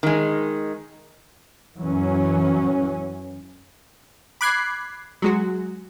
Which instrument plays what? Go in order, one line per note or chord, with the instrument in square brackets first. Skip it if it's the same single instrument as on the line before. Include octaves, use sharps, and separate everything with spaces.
[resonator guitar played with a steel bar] D#3 G#3
[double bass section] F#2 E3 F#3 C#4
[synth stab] B5 D6 F#6 G#6 C7
F#3 G#3 F#4